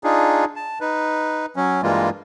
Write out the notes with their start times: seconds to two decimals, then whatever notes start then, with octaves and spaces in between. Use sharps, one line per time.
0.04 D4 D#4 F4 G#4
0.56 A5
0.81 D#4 B4
1.56 F#3 C#4
1.83 G2 E3 G3 G#3 A#3 F4